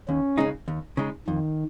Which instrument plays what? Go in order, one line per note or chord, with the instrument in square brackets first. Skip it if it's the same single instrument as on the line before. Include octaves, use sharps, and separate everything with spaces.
[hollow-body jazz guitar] D#2 [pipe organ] C#4
[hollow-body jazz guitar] C#3 G#3 D#4
D#2
C#3 G#3 D#4
[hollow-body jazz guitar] F2 [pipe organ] D#3